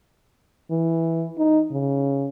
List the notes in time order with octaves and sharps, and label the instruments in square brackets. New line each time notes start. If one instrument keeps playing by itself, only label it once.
[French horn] E3
D#4
C#3